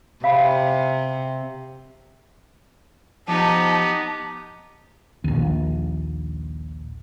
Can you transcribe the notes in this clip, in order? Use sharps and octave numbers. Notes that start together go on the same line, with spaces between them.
C3 F5 B5
F3 B3 D#4 G4 A5
A#1 D#2